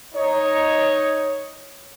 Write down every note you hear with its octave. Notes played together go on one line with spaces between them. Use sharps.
D#4 C#5